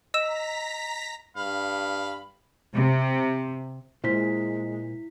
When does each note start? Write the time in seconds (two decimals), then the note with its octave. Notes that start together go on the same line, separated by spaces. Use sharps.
0.14 D#5 A#5 E6 A#6 B6 E7
1.37 G2 F5 B5
2.73 C3
4.04 A#2 G#3 E4 C5 B6